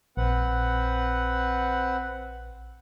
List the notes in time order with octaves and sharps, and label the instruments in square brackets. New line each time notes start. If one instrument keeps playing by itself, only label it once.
[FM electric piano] A#1 [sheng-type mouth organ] C4 B4 F#5